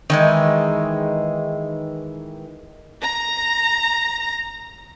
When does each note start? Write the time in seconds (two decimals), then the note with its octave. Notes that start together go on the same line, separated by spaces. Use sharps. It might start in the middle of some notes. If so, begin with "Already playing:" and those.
0.10 D#3 E3 G#3
3.01 A#5 A#6